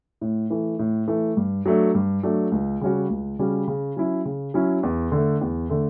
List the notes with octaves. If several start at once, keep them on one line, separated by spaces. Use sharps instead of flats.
A2
E3 A3
A2
E3 A3
G2
F#3 A3 D4
G2
F#3 A3 D4
C#2
C#3 G3 C#4 F#4
C#2
C#3 G3 C#4 F#4
C#3
F#3 C#4 E4
C#3
F#3 C#4 E4
E2
D3 A3
E2
D3 A3